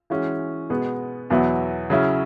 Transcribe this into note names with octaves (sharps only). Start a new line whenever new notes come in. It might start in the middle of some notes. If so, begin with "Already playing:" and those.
E3 G#3 C#4 F#4
B2 G#3 B3
E2 B2 F#3 B3 E4
C#3 F#3 C#4 E4